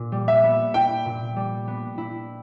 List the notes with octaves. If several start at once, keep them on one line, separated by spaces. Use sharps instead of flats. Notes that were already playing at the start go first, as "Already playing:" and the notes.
Already playing: A#2
G3
E5
B3
E4 G5
A#2
G3
B3
E4